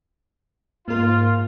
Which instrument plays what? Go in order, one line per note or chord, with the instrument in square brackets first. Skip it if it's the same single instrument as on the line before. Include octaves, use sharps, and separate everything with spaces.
[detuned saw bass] G#2 [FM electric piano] A#3 A#4 [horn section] F4